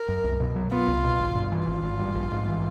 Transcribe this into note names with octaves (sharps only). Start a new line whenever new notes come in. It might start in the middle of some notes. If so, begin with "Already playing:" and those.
Already playing: A#4
F#2
C2
B2
F#3
B3 F4
C2
B2
G#1
G2
E3
G#1 F4
G#1
G2
A#1
G#2
E3